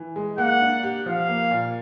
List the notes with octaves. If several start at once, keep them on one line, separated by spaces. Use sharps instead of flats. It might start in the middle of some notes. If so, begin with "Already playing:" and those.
Already playing: E3
G#3
A#3 F#5
D4
G4
F3 F5
A#3
A#2